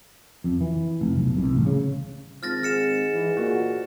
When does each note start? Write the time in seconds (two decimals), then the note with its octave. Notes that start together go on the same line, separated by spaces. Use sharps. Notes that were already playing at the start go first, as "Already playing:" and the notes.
0.44 F2
0.61 E3
1.01 F1
1.18 B1
1.37 C2
1.55 A1
1.66 C#3
2.43 G#1 F3 F6 A6 A#6
2.63 G#2 F6 C#7 E7
3.14 E3
3.37 A#2 F#4